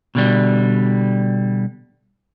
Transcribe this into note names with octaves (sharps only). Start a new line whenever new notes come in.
B2 D3 G3